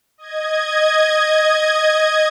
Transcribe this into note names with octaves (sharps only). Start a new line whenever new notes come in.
D#5 G#6